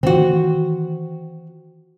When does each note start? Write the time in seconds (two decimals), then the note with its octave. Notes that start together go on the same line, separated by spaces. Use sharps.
0.03 D#3 E3 C4 F#4